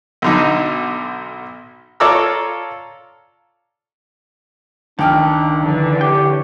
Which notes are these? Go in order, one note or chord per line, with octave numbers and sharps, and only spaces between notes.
B1 D3 D#4
F4 A4 C#5 D5 A#5 E6
C#2 D#3 D4 G5 F6
D3 E3
G4 C#5 G5